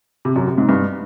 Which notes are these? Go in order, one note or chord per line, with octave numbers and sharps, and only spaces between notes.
C3
F#2
C3
G#2
G2